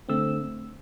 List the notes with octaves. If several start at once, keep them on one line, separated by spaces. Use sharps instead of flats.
D3 A3 C4 E6